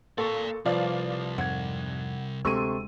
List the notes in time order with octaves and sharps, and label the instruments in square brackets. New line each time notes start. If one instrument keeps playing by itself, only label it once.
[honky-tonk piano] A#2 [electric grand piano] A4 C#6 [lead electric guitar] D5 F5
[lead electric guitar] C2 [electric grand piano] F3 B4 [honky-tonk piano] D5 F5
[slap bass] F2 G#2 [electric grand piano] F#5 G#6
[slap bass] D2 G#3 [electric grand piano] C3 A4 D#7 [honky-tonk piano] C6 C#6 E6